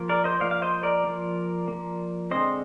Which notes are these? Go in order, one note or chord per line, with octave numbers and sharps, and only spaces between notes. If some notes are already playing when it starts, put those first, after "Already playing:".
Already playing: F3 A#3
A#4 D5
C5 D#5
F3 A#3 D5 F5
F5
C5 D#5
A#4 D5
F3 A#3
F3 A#3
D3 G#3 C4 C5 D#5